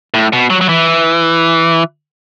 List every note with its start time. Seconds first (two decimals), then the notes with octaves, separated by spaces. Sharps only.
0.14 A2
0.33 B2
0.50 F#3
0.61 F#3
0.69 E3